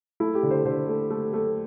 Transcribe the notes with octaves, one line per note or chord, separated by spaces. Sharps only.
A3 E4
G4
D3
C5
D3 C5
A3
A3
A3